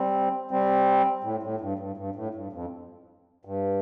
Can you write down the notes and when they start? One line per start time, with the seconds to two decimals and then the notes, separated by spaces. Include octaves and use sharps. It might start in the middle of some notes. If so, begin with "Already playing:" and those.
Already playing: G3 C4
0.51 G3 C4
1.24 A2
1.43 A2
1.61 G2
1.79 G2
1.97 G2
2.16 A2
2.35 G2
2.53 F2
3.45 G2